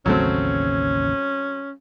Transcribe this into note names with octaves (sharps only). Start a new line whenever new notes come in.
A1 D#2 C#3 F#3 A3 C4 C#4